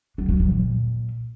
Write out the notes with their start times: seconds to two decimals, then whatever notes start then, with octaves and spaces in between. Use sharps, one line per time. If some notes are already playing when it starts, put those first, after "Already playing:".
0.18 F#3
0.29 F#3
0.40 F#3
0.51 A#2